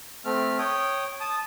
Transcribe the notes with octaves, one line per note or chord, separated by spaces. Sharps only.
A3 C4 F6
C#5 G5 D#6
A5 D#6